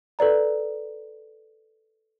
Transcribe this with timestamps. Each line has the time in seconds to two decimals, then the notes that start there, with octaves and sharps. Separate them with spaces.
0.19 A4 B4 D5 A#5